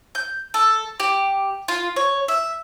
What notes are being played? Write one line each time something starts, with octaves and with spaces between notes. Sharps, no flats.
G6
A4
G4
F4
C#5
E5